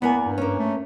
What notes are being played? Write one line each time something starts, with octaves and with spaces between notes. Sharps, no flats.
E2 A#3 B3 G#5
G2
A#3 C#4
A3